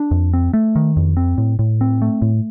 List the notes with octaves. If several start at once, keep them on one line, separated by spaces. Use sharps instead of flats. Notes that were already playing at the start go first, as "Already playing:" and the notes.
Already playing: D4
F2
C4
A3
D#3
F2
C4
A2
A2
C4
A3
A2